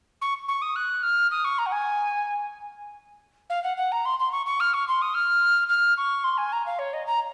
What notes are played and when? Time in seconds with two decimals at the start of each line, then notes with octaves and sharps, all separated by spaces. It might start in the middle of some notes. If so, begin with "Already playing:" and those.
0.21 C#6
0.48 C#6
0.61 D#6
0.75 F#6
1.02 F6
1.31 D#6
1.44 C#6
1.58 A#5
1.66 F#5
1.72 G#5
3.49 F5
3.63 F#5
3.77 F#5
3.91 A#5
4.05 C6
4.19 C6
4.31 C#6
4.46 C#6
4.60 F6
4.73 C#6
4.87 C6
5.01 D#6
5.14 F6
5.69 F6
5.97 C#6
6.24 C6
6.37 G#5
6.52 A#5
6.66 F5
6.78 C#5
6.93 D#5
7.06 A#5